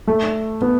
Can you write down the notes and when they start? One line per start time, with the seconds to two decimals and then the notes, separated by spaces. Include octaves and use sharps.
0.07 A3
0.62 B3